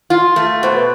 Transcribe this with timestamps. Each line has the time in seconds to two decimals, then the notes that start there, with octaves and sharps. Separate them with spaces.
0.10 F4
0.36 A3 F5
0.63 B2 C5
0.76 B4